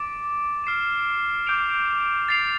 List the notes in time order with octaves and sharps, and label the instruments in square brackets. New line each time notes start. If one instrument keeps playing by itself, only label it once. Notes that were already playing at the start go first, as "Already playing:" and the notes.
Already playing: [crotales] D6 A6 D7
F6 C7 E7
D6 G6 D7 F7
A6 C7 F7